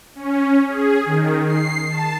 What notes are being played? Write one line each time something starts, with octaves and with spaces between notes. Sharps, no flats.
C#4
G#4
D#3
C7
A5